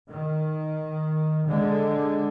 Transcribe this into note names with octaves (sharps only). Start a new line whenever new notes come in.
D#3
D3 G#3